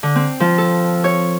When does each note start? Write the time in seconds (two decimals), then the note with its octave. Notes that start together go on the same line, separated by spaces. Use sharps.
0.03 D3
0.15 C4
0.40 F3
0.58 A4
1.04 C#5